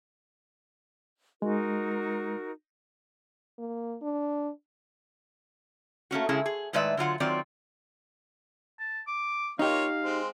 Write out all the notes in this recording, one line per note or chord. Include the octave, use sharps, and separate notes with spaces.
G#3 D#4 F#4 A#4
A#3
D4
A3 A#3 C#4 F#4
C#3 G#3 C#4 E4 G#4
G#4
A2 D#3 G#3 B4 D5 E5
D3 F#3 F4 F#5
D#3 F#3 C4 F4 D5
A5
D6
A#3 D#4 F4 G4 C#5 F5
G#3 C4